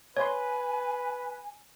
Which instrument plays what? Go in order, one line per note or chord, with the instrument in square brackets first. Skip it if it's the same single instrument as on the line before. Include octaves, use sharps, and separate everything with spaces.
[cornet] B4 [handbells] C#5 C6 [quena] G#5